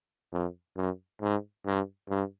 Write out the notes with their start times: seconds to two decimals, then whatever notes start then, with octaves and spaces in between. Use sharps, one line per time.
0.32 F2
0.76 F#2
1.22 G#2
1.66 G2
2.10 G2